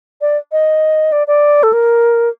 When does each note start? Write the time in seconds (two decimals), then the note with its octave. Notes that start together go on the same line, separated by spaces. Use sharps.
0.21 D5
0.52 D#5
1.12 D5
1.27 D5
1.63 A4
1.73 A#4